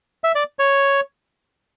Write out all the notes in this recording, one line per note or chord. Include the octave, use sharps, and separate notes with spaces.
E5
D5
C#5